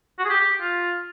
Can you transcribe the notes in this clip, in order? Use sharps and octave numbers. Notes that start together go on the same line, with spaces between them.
F#4
G#4
G4
G4
F4